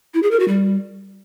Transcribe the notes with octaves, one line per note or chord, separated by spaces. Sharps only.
E4
G#4
A#4
F#4
G3